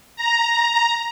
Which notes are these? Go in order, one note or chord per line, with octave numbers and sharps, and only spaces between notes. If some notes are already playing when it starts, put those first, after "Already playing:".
A#5